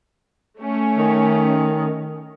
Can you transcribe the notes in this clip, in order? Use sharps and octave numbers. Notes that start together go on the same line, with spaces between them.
A3 C#4
D#3